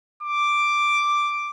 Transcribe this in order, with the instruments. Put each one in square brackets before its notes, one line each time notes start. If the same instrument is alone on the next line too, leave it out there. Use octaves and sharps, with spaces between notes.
[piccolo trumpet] D6